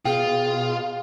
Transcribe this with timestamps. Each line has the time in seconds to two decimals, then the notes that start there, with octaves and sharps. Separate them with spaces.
0.05 B2 F4 G#4 G5